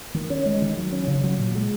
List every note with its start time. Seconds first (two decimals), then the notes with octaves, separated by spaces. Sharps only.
0.14 D#3
0.30 C#4
0.46 G#3
0.62 D#3
0.77 F#3
0.92 C#4
1.08 C#3
1.24 F#3
1.39 A#2
1.55 G#3